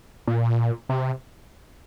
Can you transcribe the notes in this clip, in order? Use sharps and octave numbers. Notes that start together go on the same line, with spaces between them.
A#2
C3